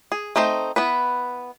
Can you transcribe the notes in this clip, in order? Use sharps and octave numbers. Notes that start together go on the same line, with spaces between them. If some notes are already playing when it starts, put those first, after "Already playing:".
G#4
A3 C4 D#4 C5
B3 E4 B4